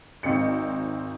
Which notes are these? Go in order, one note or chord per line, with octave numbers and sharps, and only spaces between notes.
G#1 C4 D#5 C#7